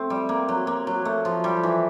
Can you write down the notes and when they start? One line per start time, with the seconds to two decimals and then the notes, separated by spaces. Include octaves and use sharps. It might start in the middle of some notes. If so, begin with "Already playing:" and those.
Already playing: A3 C4
0.10 G3
0.29 A#3
0.49 F#3
0.67 A#3
0.87 F#3
1.05 A3
1.25 F3
1.44 G3
1.63 E3